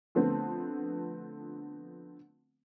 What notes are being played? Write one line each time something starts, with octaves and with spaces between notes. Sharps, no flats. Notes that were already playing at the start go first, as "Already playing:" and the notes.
D3 F3 A3 B3 C4